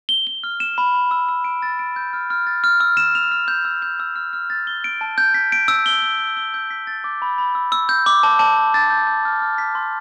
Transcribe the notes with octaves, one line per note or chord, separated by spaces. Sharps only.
G7
G7
F6
E7
B5
B5
E6
E6
D7
A6
D7
G6
F6
F6
A6
F6
E6
E7
F7
F6
G6
E6
G6
E6
F6
F6
A6
G7
D7
A5
G6
B6
D7
E6
G7
G7
G7
G7
G6
B6
A6
D6
B5
B5
E6
E6
G6
D6
A5
A5
A5
A6
G6
G6
F6
F6
B6
C6